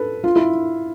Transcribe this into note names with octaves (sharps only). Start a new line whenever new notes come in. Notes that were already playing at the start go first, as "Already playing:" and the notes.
Already playing: A4 B4
F4
E4